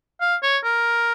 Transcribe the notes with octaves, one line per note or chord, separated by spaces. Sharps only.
F5
C#5
A#4